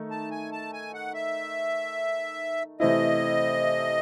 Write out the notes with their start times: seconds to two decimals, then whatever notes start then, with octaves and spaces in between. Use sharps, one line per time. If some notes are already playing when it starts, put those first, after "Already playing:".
Already playing: D#3 A3 D#4
0.11 A5
0.31 G#5
0.52 A5
0.73 G#5
0.94 F#5
1.14 E5
2.80 C3 E3 A3 C4 E4 D#5